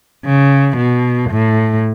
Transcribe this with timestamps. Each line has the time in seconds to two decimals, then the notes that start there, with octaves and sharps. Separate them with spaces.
0.25 C#3
0.78 B2
1.31 A2